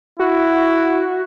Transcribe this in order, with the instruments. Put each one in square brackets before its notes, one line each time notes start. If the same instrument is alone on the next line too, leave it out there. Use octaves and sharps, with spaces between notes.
[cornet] E4 [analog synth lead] F#4